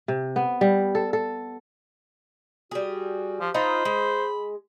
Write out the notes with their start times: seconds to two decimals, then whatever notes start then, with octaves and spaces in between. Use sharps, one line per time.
0.08 C3
0.36 B3
0.61 G3
0.95 A4
1.13 A4
2.71 G3 F#4 G#4
3.41 F3 G4
3.54 D#4 F4 C5 A#5 B5
3.85 G#3 B5